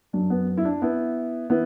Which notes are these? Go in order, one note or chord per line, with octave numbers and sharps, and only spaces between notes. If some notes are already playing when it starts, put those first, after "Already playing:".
F#2 F#3 D4
B3
E4
D4
B3 E4
E3 B3 E4